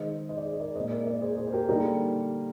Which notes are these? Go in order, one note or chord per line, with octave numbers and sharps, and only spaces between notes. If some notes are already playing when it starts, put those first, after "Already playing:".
Already playing: D#3 G#3 C5 D#5
C5 D#5
D5
G#4 C5
D#5
A#4 D5
A#2 G#3 C5 D#5
A#4 D5
A#4 D5
G#4 C5
G#4 C5
C5
G4 A#4
D3 G3 A#3 D#4 G4